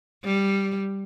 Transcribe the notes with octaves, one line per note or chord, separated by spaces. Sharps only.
G3